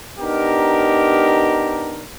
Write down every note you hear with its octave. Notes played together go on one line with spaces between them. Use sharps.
B3 D4 D#4 G4 A#4